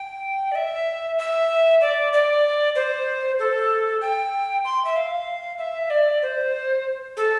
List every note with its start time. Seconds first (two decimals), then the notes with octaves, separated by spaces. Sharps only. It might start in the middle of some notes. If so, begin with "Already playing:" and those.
Already playing: G5
0.51 D5
0.55 E5
1.18 E5
1.81 D5
2.13 D5
2.75 C5
3.39 A4
4.01 G5
4.65 C6
4.85 E5
4.96 F5
5.58 E5
5.90 D5
6.22 C5
7.17 A4